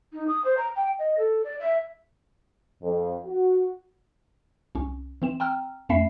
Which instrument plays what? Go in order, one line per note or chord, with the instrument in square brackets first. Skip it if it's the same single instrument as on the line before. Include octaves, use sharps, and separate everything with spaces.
[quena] D#4
D#6
C5
A#5
G5
D#5
A4
D5
E5
[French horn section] F2
F#4
[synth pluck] C2 C#4
E3 C4 E7
G5 A#5 E6 F6
F2 A3 C#4 E5 B5 C7